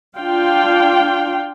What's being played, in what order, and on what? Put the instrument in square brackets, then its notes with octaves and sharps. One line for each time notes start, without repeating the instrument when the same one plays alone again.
[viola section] D4 F4 F5 G5